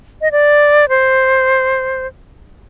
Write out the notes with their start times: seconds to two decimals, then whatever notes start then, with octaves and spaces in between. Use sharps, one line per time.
0.21 D#5
0.32 D5
0.89 C5